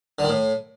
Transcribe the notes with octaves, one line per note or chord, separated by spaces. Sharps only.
D3
D#3
A2